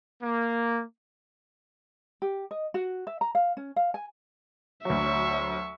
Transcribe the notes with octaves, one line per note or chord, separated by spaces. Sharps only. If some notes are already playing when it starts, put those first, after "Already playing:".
A#3
G4
D#5
F#4
E5
A#5
F5
C#4
F5
G#5
D2 F#3 E5 C#6